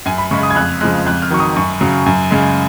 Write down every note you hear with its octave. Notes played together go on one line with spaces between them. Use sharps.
F#2 G#5
B5
C#3 G#3 C#6
D#6
G#6
F2 F#6
C#3 F3 G#3 F#6
F2 F#6
F6
D#3 F#3 C#6
D#6
F#2 C#6
C#3 F#3
F#2
C#3 G#3